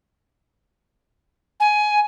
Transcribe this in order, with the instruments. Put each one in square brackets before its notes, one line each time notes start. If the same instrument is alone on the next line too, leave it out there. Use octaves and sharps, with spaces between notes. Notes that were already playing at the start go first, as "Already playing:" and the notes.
[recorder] G#5